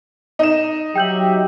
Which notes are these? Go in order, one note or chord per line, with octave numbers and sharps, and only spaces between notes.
D#4 E7
F#3 G4 E5 G5 G6 F#7